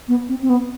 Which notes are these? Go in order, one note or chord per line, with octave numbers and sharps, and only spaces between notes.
B3
C4
C4
B3